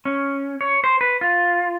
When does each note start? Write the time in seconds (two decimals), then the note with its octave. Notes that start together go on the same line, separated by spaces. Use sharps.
0.05 C#4
0.61 C#5
0.84 C5
1.01 B4
1.21 F4